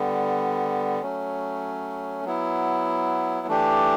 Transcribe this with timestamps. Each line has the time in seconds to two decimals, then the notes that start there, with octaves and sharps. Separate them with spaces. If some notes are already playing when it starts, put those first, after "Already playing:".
Already playing: D3 G3 B3
1.02 F#3 A3 C#4
2.24 F#3 B3 E4
3.47 E3 A3 D4 G4